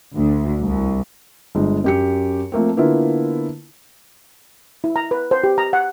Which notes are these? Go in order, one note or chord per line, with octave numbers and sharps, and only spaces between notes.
D2
C2
G1 G#3
F#2 G4 C#7
F3 A3 A#3 C4
D3 A#3 B3 E4 F4
E4
A#5
B4
C5
G4
A#5
F#5